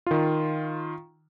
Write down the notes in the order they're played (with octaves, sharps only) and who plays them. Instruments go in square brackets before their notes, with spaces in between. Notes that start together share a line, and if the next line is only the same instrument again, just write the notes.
[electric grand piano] D#3 F4